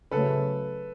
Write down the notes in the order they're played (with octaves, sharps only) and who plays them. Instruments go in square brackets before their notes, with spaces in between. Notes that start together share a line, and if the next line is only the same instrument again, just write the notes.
[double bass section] C#3 F#3 A3 [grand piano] A4 B4